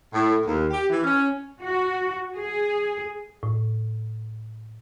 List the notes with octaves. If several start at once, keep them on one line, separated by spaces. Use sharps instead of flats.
A2
D#2
G4
E3
C#4
F#4
G#4
A2